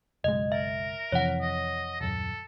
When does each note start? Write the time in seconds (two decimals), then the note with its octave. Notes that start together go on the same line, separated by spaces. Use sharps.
0.24 F#1 B1 G#3 D#5
0.52 A#4 E5
1.12 F2 C3 E3 C#5 F#5
1.41 D#5
2.01 D#1 F#2 A4